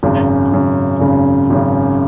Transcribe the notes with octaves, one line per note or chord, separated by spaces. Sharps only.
G#1 F#2 C#3
G#1 F#2 C#3
G#1 F#2 C#3
G#1 F#2 C#3